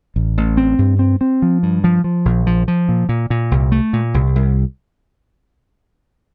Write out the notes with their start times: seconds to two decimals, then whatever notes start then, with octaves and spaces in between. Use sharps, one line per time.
0.16 A1
0.37 A1
0.57 C4
0.79 G2
0.99 C4
1.21 C4
1.42 F3
1.63 G2
1.84 F3
2.04 F3
2.25 A#1
2.47 F3
2.68 F3
2.89 A#2
3.09 A#2
3.30 A#2
3.51 C2
3.72 A3
3.93 A#2
4.14 C2
4.36 C2